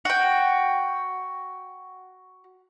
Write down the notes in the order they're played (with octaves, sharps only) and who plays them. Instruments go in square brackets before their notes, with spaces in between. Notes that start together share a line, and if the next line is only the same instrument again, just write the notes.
[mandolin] F#4 G5